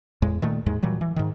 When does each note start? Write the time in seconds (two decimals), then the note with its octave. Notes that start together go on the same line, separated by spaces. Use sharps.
0.22 E2 A2 G#3
0.42 A#2 D#3 A3
0.66 D#2 G#2 G#3
0.82 A#2 E3 F#3 G3
1.01 E3
1.16 G#2 D#3